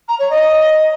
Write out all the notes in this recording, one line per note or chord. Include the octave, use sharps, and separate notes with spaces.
A#5
C#5
D#5